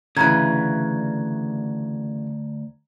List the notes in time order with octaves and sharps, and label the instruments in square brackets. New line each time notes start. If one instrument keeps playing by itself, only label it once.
[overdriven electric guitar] D2 [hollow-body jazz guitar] C#3 E3 [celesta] A#5 G#6